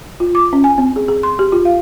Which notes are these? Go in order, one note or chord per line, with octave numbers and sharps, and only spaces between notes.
F4
D6
C#4
G#5
C4
G#4
G#4
C6
G4
F4
F5